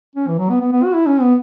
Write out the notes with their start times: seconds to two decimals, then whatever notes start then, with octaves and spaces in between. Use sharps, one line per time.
0.15 C#4
0.27 E3
0.38 F#3
0.50 B3
0.61 B3
0.72 B3
0.84 F#4
0.94 E4
1.06 C#4
1.21 B3